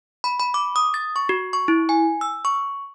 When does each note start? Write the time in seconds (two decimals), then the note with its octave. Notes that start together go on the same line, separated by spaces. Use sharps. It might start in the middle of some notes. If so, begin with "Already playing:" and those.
0.24 B5
0.40 B5
0.54 D6
0.76 D#6
0.94 A6
1.16 C#6
1.29 F#4
1.53 C#6
1.68 E4
1.89 G#5
2.21 E6
2.45 C#6